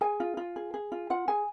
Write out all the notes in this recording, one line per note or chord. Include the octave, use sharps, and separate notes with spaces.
G#4 G#5
F4
F4
G#4
G#4
F4
F4 F#5
G#4 G#5